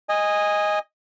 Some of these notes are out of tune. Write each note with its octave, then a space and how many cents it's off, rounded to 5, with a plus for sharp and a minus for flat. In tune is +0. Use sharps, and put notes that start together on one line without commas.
D#5 +0 G#5 -15